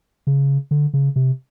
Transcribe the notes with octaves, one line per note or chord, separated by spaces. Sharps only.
C#3
D3
C#3
C3